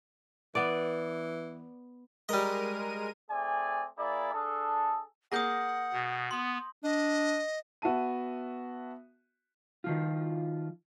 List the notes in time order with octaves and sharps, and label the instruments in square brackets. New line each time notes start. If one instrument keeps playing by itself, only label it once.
[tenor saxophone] E3 [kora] B3 D5
[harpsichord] G3 D#5 [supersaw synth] G#3 A#4 D#7
[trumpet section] A3 C4 G#4 D5 G#5
A#3 E4 G#4 D5
D4 G#4 A4
[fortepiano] A#3 G#4 [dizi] F#5 [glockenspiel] D#6 G6 A#6
[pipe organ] B2
[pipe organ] B3 [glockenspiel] C6
[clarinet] D4 [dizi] D#5
[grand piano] B3 F#4 E5 A5 D#7
[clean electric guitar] D#3 F3 F4